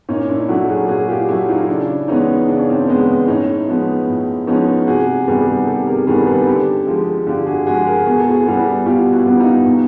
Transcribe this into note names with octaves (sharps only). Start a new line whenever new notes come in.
A#2 C#4 D#4
D4 E4
F#3 A3 E4 F#4
F#4 G#4
A#2 F#4 G#4
F4 G4
F#3 A3 E4 F#4
D#4 F4
C#3 D4 E4
E3 G#3 B3 C#4 D#4
C#3 D4
C#4
C4 D4
E3 G#3 B3
A2 C#4 D#4
F3 G#3 B3
A2
F3 G#3 B3 C#4 D#4
C3 F#4 G#4
D#3 G3 B3 F#4 G#4
C3 G4 A4
G#4 A#4
D#3 G3 B3 G#4 A#4
A4 B4
D3 G4 A4
F3 G#3
D3 F4 G4
F#4 G#4
F3 G#3 F#4 G#4
G#4 A#4
B2 G#4
A4
F#4 G#4
G3 B3
B2 F4 G4
E4 F#4
G3 B3
D#4 F4
B2